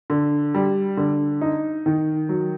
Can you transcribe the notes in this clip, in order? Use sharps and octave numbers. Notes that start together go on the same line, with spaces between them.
D3
G3
D3
D#4
D#3
F#3